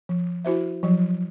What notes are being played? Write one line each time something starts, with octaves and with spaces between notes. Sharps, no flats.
F3
E4 F#4 C5 E5
F3 F#3